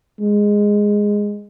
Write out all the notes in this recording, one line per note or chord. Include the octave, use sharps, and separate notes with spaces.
G#3